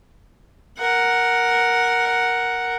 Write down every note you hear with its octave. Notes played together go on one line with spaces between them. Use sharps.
A#4 F#5